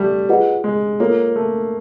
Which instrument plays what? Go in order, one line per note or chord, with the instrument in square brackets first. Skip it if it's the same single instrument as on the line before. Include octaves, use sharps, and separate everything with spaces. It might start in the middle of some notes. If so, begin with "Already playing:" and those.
Already playing: [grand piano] G3 A3
[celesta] F4 G#4 B4 D#5 F#5
[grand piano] G#3
[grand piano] A#3 [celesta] F4 A4 C#5
[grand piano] A3